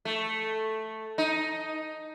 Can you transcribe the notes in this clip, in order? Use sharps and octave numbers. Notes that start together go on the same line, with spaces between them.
A3
D#4